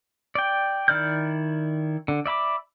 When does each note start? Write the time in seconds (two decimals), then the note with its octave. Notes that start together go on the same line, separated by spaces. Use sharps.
0.35 D5 G5
0.88 D#3 E4 D5 F6 G6
2.08 D3
2.26 D5 E5 B5 D6